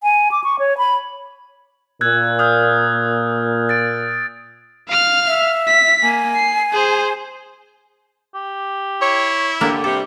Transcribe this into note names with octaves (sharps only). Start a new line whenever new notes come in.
G#5
D6
C#6
C#5
B5
A#2 E6 F#6 G#6
D#6 F6 G6
A6 D7
F5 F6
E5
B6
A#3 G#5
C7
G#4 C5
G4
E4 C#5
D3 A#3 D4 G4
C3 G3 G4 A4